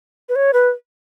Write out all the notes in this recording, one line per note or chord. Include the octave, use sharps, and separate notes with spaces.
B4
C#5
B4